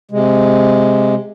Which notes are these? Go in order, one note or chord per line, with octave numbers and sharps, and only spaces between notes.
C3 G#3